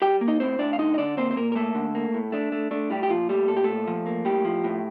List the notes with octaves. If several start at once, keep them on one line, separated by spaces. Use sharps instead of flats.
G3 G4 G5
A#3
D#4 D#5
A2 C4 C5
A2 D4 D5
F5
D3 D#4 D#5
D#5
D3 D4 D5
A#3 C4 C5
C5
A#2 A#3 A#4
A#4
A3 A#3 A4
D3
A#3
A2
A3 D4
A3
A3 D4
A2 G3 G4
G4
A#2 F3 F4
G3 A3 G4
A#2 A4
G4
A#2 A3 A4
F3
A#3
A2 G3 G4
F3
A2